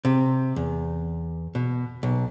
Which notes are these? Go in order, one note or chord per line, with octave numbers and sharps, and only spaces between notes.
C3
E2
B2
B1